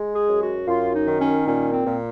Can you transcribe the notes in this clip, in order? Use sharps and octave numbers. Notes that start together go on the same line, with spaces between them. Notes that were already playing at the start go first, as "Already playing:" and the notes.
Already playing: G#3
G#4
F#2
F#4
F#2 F4
D#4
D#3
C#4
A#2 C#4
C4
A#2